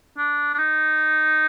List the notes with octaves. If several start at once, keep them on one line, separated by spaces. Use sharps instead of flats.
D4
D4
D#4